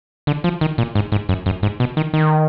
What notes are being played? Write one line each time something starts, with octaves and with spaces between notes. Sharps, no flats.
D3
F3
D#3
A#2
G#2
G#2
F#2
F#2
G#2
B2
D#3
D#3